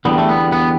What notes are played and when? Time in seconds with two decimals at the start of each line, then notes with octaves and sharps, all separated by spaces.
0.05 E2 D3 G3 B3
0.18 A3
0.29 B3
0.52 B3